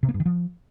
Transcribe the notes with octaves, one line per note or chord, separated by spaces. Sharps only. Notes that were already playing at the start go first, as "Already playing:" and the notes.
C3
A#3
G2
D#3
F3